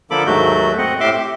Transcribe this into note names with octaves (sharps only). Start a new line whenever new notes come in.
D3 F3 A#3 A4 B5 D6
D#2 G#2 F#3 A3 F#4 G6
C4 D#5 F#5
A2 G4 E5 C6 D6
G4